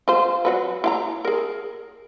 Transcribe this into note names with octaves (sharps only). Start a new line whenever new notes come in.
F4 C5
F#3 F#4 B4
E4 F5 A#5
G#4 A#4